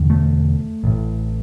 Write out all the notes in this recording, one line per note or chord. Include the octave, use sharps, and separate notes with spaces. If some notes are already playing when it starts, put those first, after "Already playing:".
Already playing: E1 E2 D3
A3
A1 A2